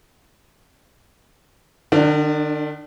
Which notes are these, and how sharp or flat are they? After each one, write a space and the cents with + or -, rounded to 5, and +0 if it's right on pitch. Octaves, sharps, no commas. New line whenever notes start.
D#3 -45 D4 +0